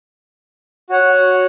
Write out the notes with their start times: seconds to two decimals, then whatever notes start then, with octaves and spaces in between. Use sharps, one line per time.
0.90 F#4 C#5 F#5